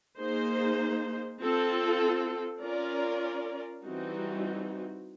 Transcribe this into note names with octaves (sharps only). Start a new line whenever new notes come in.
A#3 D#4 G#4 C5
C4 F4 A4
C#4 F4 A#4 D5
E3 G3 C4 D#4 F#4